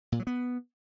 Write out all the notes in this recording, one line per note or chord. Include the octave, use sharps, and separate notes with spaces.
A#2
F#3
B3